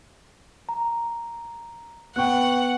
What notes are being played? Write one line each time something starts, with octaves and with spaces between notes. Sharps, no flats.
A#5
B3 F#5 G5 C#6 F#6